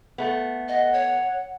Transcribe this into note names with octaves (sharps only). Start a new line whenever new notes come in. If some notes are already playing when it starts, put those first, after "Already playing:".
A3 B3
D#5 F#5
C#5